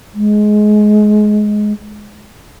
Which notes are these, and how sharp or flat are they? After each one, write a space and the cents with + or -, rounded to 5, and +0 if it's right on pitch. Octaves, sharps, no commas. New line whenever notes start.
G#3 +20